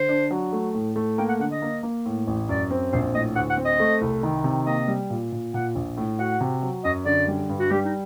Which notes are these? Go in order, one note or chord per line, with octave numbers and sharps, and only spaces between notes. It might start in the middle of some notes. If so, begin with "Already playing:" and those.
Already playing: D3 C5
D4
F#3
A3
A2
A3
A#3 G5
F#5
D3 F#5
D#5
A#3
A#3
A2
A1
F#2 D5
C4
A#1 C5
A2 D#5
D2 F#5
F#5
C4
D#5
A3
C2
D#3
C3
A#3 D#5
G3
A#2
A#2
A#2 F#5
A#1
A2
F#4 F#5
C3
F#3
F#2 D#5
D3 D5
G3
G2
F#4
G3 G4
D#4